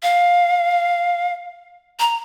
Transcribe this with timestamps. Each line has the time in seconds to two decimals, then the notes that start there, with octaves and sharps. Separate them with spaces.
0.03 F5
2.00 A#5